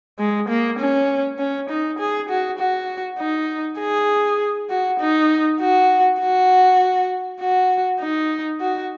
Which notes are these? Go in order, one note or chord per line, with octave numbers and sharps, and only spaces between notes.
G#3
A#3
C#4
C#4
D#4
G#4
F#4
F#4
D#4
G#4
F#4
D#4
F#4
F#4
F#4
D#4
F#4